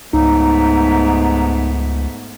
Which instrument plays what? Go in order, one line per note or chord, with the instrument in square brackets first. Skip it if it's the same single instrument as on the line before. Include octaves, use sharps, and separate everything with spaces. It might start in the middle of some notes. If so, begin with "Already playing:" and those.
[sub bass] C#2 [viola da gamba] G#2 A3 B3 [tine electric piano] D#4 [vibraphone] A#5